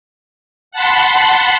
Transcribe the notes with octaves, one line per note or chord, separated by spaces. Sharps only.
F#5 A5 B5 C6